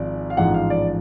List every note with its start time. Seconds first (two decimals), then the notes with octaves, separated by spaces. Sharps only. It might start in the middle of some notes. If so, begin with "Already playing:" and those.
Already playing: G#1 G#2 F3 D5
0.30 F5
0.37 A1 G#2 F3 F#5
0.54 F5
0.70 D5